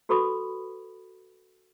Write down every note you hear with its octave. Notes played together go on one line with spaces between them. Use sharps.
F#4 A4 B4 B5 C#6 D#6